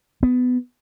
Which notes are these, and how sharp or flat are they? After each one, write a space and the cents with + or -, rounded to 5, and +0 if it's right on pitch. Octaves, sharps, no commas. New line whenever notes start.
B3 +15